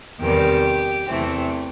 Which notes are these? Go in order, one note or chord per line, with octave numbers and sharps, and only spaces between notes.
E2 C3 D#3 G3 G4
E2 C3 E3 A3 C4